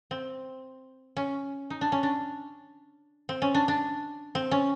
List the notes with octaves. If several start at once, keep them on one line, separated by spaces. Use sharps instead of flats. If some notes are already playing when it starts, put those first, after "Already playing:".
C4
C#4
D#4
D4
C#4
D4
C4
C#4
D4
D4
C4
C#4